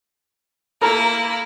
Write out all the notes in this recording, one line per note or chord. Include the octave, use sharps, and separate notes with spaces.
A#3 E4 A4 A#4 A#5